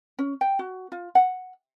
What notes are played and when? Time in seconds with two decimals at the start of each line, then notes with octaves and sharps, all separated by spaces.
0.19 C#4
0.41 G5
0.59 F#4
0.92 F4
1.15 F#5